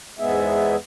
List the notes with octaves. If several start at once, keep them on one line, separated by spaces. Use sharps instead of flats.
E2 G#2 G#3 B3 G#4 E5